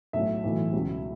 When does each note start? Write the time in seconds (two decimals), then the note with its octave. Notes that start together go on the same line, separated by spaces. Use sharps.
0.13 B1 A2 F#3 E5
0.44 B1 A2 E3
0.73 C#2 B2 F#3